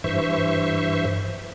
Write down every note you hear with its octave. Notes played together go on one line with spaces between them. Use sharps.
G2 E3 C5 E5 C#6